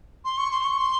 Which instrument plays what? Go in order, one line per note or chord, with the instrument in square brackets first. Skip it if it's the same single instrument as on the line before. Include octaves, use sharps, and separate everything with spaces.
[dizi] C6
C#6
C6
C#6
C6